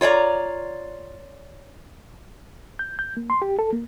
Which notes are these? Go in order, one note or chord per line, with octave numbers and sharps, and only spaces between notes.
F4 C#5 D5 A#5
G6
G6
A#3
C6
G4
A4
A#3